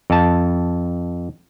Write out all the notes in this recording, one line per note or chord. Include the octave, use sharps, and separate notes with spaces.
F2 A5